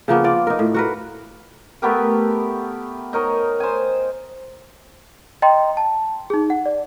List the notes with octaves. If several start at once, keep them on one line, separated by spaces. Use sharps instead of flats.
C#3 F3 A#3 B3
F4 D5
D#4 A#4
A2
F#4 A#4 B4
A3 B3 G4 A#4
D#4 A#4 C#5 D#5
C5 G#5
D#5 G5 A#5 C6
A5
D#4 G#4
F#5
D5